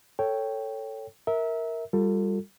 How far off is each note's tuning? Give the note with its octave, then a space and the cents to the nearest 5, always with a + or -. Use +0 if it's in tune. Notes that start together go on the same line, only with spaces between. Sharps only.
A4 +10 C#5 +0 G5 +0
A#4 +0 E5 -25
G3 +10 F4 +30 A4 +30